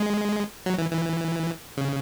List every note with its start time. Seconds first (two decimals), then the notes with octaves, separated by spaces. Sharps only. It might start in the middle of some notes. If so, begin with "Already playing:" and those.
Already playing: G#3
0.66 F#3
0.78 E3
0.91 E3
1.77 C#3